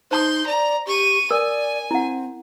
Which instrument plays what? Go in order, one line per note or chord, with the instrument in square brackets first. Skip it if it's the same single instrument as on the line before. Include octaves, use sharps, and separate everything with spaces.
[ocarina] D#4 [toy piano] C5 A5 D#6 [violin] C6 G6
[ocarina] D5 [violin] A#5
[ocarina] G4 [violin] C#6 D#7
[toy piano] A#4 D#6 [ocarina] D5 [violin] G#5
[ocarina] C4 [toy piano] E4 F#5